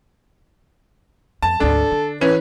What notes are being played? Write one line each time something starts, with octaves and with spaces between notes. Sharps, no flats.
F2 A5
G#1 D2 D4 A4
D3
E3 C#4 B4